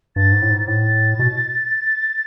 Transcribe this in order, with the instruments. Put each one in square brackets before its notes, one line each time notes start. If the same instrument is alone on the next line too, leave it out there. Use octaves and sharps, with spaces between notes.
[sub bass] G2 [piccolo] A6
[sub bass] G#2
A2
G#2
[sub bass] A2 [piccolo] A6
[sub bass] B2